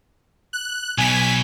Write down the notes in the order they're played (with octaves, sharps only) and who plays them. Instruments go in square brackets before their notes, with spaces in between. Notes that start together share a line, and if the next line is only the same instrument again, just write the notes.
[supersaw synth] F#6
[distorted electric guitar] B1 B2 [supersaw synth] G#5 B6